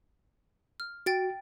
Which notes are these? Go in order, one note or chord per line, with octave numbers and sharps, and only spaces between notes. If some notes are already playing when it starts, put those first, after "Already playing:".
F6
F#4 G5 A6 D7